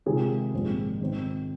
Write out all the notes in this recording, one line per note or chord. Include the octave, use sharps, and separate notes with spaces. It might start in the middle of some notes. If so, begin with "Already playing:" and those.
C3 D#3 G#3 F4 G#4
A#1 G#2 D#3 C4
G#1 G#2 D#3 G#3 C4